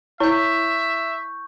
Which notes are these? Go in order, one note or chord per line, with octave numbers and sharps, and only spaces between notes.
E4 C#5 E5 C#6 G6